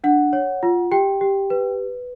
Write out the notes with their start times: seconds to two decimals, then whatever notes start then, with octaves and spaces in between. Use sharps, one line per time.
0.04 D4 F#5
0.33 C#5
0.63 F4
0.91 G4 G5
1.21 G4
1.50 B4